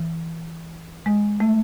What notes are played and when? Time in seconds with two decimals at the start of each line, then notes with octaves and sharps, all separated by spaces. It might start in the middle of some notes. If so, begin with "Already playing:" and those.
Already playing: E3
1.06 G#3
1.40 A3